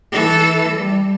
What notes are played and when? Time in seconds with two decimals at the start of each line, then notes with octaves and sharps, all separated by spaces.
0.12 E3 A4
0.76 G3